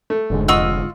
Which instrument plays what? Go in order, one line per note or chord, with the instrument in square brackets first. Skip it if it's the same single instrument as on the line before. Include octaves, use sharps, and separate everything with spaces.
[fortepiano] A3
[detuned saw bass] F1 [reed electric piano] G#2 D3 G#3
[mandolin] F4 E6 [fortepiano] D#5 F#5 C#6